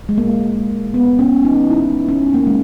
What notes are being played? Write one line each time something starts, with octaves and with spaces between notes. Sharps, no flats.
G#3
A#3
B3
C#4
D#4
E4
C#4
A#3
G#3